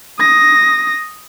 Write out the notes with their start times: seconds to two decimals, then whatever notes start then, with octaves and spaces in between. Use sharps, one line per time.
0.20 D#6 A#6